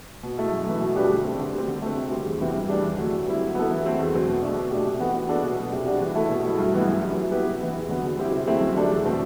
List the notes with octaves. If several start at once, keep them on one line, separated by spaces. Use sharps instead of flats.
B2
A3 E4
F#2
E3 A3
B2
G3 D4 G4 B4
D3
A3 C4
D3
G3 C4
D3
A3 C4
C3
G3 C4
E2
C3 E3 B3
G2
E3 A3 D4 G4
E2
D3 F#3 A3
D3
G3 C4 E4
F#3
B3 E4 A4
E3
A3 C4 F#4
E2
D3 F#3 C4
B2
A3 D4
B2
A3 D4 G4
C3
E3 B3 F#4 A4
E3
B3 D4 F#4 A4
B2
F#3 B3
C3
G3 D4 F#4
E3
A3 E4 A4
B2
F#3 A3 E4
G2
E3 B3 E4
F#2
E3 G3
F#3
B3 E4 G4 B4
C3
E3 B3 E4
E2
D3 F#3 B3
D3
G3 C4 E4 G4
C3
F#3 A3 C4 E4
F#2
D3 G3 D4 A4
E2
B2 A3 C4